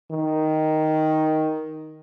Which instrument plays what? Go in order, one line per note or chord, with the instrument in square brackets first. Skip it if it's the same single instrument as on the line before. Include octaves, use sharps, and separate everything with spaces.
[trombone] D#3